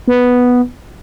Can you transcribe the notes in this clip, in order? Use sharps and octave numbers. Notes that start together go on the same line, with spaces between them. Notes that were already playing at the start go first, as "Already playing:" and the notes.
B3